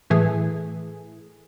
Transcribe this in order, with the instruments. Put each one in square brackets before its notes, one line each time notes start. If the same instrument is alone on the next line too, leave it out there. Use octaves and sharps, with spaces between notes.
[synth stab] A2 E3 A3 G#4